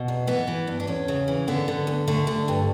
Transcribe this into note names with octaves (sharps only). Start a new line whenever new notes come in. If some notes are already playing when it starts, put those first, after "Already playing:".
Already playing: B2
E2
E3 B3
E3
G2
D4
E2 C#4
C#3
E3
D3 B3
D3
D2
D3 A3
D3
G2